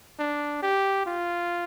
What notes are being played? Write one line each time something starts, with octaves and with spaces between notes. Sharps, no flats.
D4
G4
F4